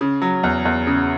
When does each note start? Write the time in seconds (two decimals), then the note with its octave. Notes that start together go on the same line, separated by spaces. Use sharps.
0.01 C#3
0.22 F#3
0.43 E2
0.65 E2
0.87 C#3